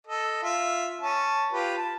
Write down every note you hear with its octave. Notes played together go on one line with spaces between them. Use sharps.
A4 D#5
F4 E5
C#4 A5
F4 G4 B4
A5